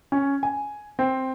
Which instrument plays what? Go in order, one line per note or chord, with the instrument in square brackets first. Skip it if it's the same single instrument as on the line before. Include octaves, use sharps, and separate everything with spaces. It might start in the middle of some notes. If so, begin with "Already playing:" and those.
[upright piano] C#4
G#5
C4